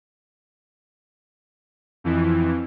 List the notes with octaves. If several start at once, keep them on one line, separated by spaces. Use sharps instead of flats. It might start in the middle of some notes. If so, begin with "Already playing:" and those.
F2 E3